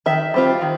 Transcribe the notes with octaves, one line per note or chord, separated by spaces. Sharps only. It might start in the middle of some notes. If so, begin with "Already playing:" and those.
D#3 E5
G3 C4 F4
D#3